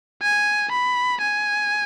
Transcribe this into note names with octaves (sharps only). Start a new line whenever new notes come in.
G#5
B5
G#5